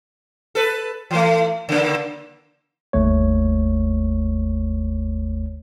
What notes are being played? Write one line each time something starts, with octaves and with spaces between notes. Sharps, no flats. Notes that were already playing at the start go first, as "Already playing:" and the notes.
A4 B4
E3 A3
C#3 A#3
G1 D#2 A3 C#5